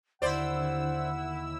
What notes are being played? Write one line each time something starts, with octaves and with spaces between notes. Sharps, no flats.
D#2 D3 E4 C5 D5 F#5 E6